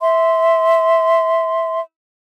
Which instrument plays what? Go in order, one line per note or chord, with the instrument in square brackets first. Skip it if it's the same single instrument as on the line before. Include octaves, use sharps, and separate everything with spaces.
[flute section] E5 C6